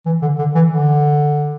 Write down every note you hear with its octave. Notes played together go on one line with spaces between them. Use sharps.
E3
D3
D3
E3
D3